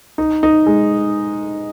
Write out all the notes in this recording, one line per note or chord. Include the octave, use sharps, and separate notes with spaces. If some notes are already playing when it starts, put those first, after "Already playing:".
D#4
D#4
G#3